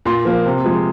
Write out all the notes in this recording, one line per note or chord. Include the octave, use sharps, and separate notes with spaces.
A#2 C6
F3 A#3
C3
F3 G#3